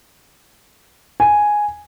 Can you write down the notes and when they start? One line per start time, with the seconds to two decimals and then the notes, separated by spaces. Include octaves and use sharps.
1.20 G#5